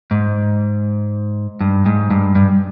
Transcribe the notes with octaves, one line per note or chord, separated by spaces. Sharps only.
G#2
G2
G#2
G2
G2